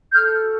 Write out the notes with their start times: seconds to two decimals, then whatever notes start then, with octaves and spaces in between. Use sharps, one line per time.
0.12 A4 F6 G6
0.40 F#4